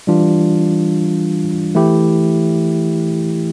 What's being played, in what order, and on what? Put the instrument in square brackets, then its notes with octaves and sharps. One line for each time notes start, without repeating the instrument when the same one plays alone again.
[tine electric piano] E3 G3 D4 F4
E3 A3 E4 G4